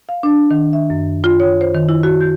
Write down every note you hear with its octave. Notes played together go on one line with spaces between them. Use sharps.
F5
D4
D#3
E5
F#2
F4
C#5
C5
D#3
E4
F#4
G6